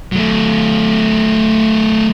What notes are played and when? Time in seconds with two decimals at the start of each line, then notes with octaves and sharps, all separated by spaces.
0.12 F#3 A3